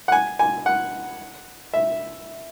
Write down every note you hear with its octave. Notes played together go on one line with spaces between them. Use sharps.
F#5
G#5
G#5
F#5
E5